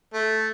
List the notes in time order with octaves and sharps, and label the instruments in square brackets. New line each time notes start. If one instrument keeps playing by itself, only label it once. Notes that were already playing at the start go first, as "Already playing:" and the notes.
[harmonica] A3